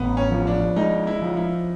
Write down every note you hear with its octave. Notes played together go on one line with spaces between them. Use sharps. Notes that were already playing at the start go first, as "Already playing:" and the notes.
Already playing: A1 B3
C#4
F3
D4
G#3 D#4
E4
F3
E4